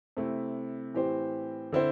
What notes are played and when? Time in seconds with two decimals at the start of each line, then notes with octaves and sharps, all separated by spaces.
0.17 C3 A3 E4
0.94 A2 E3 C4 G4 C5
1.72 D3 C4 E4 C5